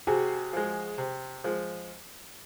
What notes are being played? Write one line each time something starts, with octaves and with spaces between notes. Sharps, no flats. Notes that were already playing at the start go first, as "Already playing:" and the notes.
C3 F#4 G#4
F3 G#3
C3
F3 G#3